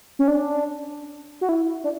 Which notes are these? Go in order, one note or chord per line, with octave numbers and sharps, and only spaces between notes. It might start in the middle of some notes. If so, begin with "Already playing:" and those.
C#4
D4
F#4
E4
D4